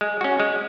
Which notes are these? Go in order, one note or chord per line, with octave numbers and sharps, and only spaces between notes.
G#3
C#4 F#4
G#3